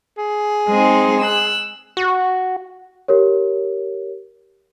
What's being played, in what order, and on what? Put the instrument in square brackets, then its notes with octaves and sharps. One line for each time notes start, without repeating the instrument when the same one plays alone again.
[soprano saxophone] G#4
[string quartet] G#3 C4 D#4
E6 F#6
[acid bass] F#4
[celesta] G4 A#4 C#5